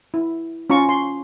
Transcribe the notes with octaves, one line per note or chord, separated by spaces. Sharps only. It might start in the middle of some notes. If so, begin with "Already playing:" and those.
E4
C#4 F4 A#5 C#6
C6